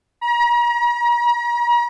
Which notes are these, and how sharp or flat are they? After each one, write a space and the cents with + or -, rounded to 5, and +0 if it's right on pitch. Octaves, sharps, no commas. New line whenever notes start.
A#5 +40